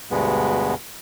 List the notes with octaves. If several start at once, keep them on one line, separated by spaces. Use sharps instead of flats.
D2 G2 B2 G#3 B3